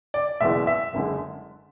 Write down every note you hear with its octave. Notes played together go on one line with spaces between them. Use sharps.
D5
F#1 E2 B2 G#3 E5
E5
F#1 F#2 D3 G#3